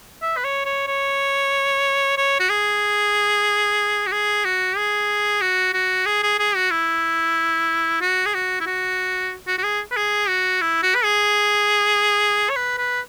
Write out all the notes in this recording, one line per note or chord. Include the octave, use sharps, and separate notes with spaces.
E5
B4
C#5
C#5
C#5
C#5
F#4
G#4
F#4
G#4
F#4
G#4
F#4
F#4
G#4
G#4
G#4
F#4
E4
F#4
G#4
F#4
E4
F#4
F#4
F#4
G#4
B4
G#4
F#4
E4
F#4
B4
G#4
C#5
B4
B4